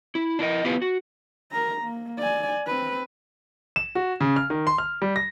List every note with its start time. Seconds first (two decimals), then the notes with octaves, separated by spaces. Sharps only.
0.15 E4
0.39 D4 E4 A#4 D#5
0.65 B3 E4 F4 G4 B4
0.82 F#4
1.52 A#4 A#5
1.81 A#3
2.19 D5 G#5
2.67 C4 B4
3.76 E7
3.95 F#4
4.21 C#3
4.36 F6
4.50 D#3
4.67 C6
4.78 F6
5.02 G3
5.16 A#6